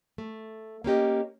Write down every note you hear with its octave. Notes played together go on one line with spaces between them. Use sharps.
A3
A#3 C#4 G4 D#5